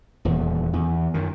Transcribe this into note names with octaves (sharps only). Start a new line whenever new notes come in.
D#1 E2
E2
F#2 D#3